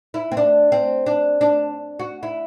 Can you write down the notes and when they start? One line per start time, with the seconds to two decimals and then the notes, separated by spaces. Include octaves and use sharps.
0.14 E4
0.32 C4
0.37 D4
0.72 C4
1.06 D4
1.41 D4
1.99 F#4
2.23 E4